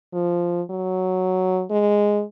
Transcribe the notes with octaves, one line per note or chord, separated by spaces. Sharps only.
F3
F#3
G#3